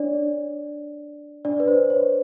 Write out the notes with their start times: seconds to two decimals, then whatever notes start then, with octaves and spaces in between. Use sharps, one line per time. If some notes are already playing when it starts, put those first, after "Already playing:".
Already playing: D4 C#5 D5
1.45 D4 D5
1.60 B4
1.68 C5
1.90 C#5